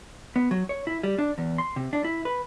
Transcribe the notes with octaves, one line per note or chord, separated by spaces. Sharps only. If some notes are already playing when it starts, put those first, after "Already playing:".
B3
F#3
C#5
E4
G3
D4
E2
C6
C3
D4
E4
B4